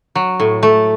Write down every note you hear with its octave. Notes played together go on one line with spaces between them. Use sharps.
F#3
A2
A3